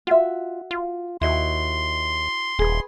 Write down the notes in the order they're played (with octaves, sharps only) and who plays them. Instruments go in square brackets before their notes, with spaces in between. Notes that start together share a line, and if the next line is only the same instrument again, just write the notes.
[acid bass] F4 [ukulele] F#4 E5
[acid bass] F4
[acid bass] D#2 [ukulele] E4 F#4 D#5 [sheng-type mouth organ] C6
[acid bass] D#1 [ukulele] G#4 B4